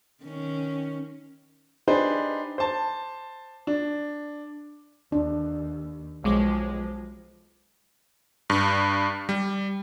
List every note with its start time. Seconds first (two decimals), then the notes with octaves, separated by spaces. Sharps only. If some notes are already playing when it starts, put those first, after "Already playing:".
0.24 D#3 C#4
1.88 D4 D#4 G4 G#4 B4 C5
2.58 C5 A5
3.67 D4
5.12 D#2 D4
6.24 B1 F3 G#3 D6
8.50 G2
9.29 G3